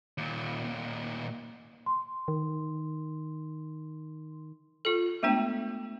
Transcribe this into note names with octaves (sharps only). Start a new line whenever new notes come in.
D#2 A#2
C6
D#3
F4 A4
G#3 A3 B3 D4 G5